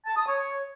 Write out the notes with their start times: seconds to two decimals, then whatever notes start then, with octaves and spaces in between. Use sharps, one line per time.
0.06 A5
0.16 D#6
0.27 C#5